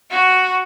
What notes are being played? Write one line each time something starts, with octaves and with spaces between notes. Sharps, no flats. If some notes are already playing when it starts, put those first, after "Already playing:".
F#4